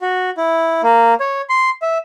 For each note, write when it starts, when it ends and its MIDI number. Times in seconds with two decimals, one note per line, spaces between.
0.01 0.30 66
0.37 0.82 64
0.83 1.14 58
1.20 1.42 73
1.49 1.70 84
1.82 1.98 76